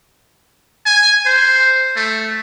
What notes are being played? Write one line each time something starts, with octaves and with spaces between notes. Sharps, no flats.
G#5
C5
A3